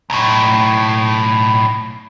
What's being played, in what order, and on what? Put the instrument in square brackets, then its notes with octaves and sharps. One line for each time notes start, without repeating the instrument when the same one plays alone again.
[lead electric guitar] B1 A2